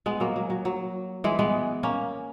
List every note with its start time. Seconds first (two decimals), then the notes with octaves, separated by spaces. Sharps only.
0.06 G#3 B3
0.20 F#3 A#3
0.36 F#3
0.50 F#3
0.65 F#3
1.24 E3 G#3
1.39 G#3 B3
1.83 A#3 C#4